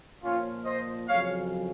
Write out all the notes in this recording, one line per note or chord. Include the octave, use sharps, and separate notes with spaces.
A#2 F3 C#4 F4
C5 D#5
F2 C#3 F#3 C#5 F5